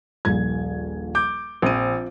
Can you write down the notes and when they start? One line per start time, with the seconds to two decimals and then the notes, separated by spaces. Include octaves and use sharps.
0.25 D#1 A#1 G#6
1.15 D6 G6
1.62 A#1 F3 C4 D#7